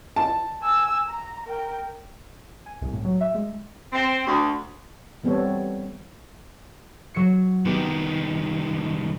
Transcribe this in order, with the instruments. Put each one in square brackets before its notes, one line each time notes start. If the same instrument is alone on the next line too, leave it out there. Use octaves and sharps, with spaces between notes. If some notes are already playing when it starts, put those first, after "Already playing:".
[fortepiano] A5
[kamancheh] G#5 E6
A#5
A#4 G5
[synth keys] G#5
C2
A2
F#3
E5
G#3
[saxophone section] C4
D2
[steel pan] E3 G3 B3 C4 A4 C#5
[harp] F#3 C#7
[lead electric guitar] C2 D#3 [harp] B3 G4